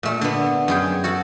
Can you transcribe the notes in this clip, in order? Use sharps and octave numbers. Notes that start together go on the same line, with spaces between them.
A#2 A3
D3 B3
F#2 G#4 G5
F#4 A4 F#5